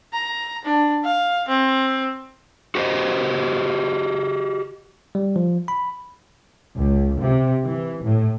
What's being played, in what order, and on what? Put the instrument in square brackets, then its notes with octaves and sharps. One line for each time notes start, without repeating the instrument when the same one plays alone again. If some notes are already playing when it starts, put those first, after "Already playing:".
[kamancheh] A#5
D4
F5
C4
[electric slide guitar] F#4 G4 B4 C5 D#5
[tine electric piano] G3
F3
B5
[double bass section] C#2
C3
E3
A2